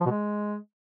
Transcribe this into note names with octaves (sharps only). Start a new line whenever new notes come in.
F3
B2
G#3